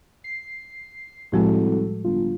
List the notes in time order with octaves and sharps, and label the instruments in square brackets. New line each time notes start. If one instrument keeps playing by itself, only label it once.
[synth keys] C7
[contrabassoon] C2 [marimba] A2 F3 G#3 [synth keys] G3 F#4 A4
[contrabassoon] G1 [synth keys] F4